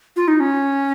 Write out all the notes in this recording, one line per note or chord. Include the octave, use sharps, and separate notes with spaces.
F4
D#4
C#4